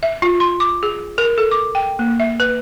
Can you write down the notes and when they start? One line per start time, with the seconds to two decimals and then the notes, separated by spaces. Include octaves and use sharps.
0.03 E5
0.22 F4
0.40 C6
0.60 D6
0.83 G#4
1.18 A#4
1.38 A4
1.51 D6
1.75 G5
1.99 A#3
2.20 E5
2.40 B4